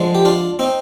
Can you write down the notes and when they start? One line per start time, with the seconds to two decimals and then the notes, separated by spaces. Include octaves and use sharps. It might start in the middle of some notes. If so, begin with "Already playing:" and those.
Already playing: D3 F3 G#3
0.15 G4
0.25 D4 F4
0.59 C4 D#4